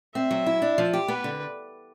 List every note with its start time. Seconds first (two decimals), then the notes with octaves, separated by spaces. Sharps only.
0.15 C4 E5
0.31 F#3
0.46 E4
0.62 D4
0.78 F3
0.93 G4
1.08 B3 B4
1.24 D3